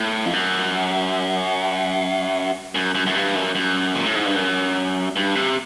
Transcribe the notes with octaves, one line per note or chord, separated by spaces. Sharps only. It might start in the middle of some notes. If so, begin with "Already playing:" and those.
Already playing: A2
F2
F#2
F#2
F#2
F#2
G2
F#2
F#2
A#2
A2
G#2
G2
F#2
G2
C3